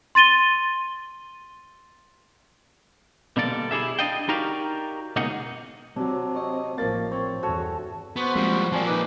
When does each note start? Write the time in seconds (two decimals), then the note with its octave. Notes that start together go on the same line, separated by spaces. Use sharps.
0.15 C6 A6 D#7 G7
3.37 B2 D3 G3 A#3 A4 D5
3.71 E4 G4 G#4 E5
3.99 D4 G#4 D5 D#5 F5 G5
4.29 D#4 F#4 G4 A#4 D5 F5
5.16 C#2 B2 A#3 D#4 G#4 F#5
5.96 C3 F#3 C4 D4
6.36 C#5 D#5
6.78 A1 F3 A#3 A6
7.12 C4 C#5
7.43 E2 G2 F#4 A4 C#5
8.16 B3 F#4 C5
8.36 F3 G3 G#3 A#3 C4
8.72 F3 A#3 C4 D5 G#5 A5
8.87 D#4 B4 D6